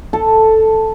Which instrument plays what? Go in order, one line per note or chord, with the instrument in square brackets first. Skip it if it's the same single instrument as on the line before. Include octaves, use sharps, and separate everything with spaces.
[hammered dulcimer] A4